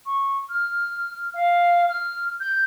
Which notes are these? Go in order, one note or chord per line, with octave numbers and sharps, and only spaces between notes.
C#6
F6
F5
F6
G6